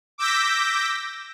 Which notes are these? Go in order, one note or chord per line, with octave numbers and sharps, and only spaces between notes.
D6 E6 G6 A#6 B6